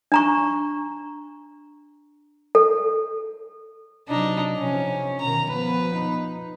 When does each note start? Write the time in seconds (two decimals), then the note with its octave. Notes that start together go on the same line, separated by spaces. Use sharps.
0.12 D4 A#5 C#6
2.55 A4
4.08 C3 F#3 D4 D#4
4.57 C3 F3 C#4
5.21 B2 D#3 A#5
5.50 F3 B3 B4
5.95 D#4